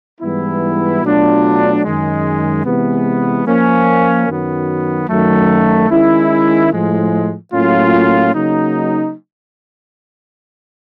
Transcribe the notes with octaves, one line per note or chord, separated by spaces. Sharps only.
G#2 E3 G3 B3 E4
B2 F#3 A3 D4 F4
F#2 D#3 G#3
C3 E3 G#3 B3
F3 A#3 C#4
F#2 D#3 F#3 B3
F#2 D#3 F#3 A3
D#3 G#3 C#4 E4
A2 F3 G#3
A2 F#3 A#3 C#4 F4
C#3 F#3 A#3 D#4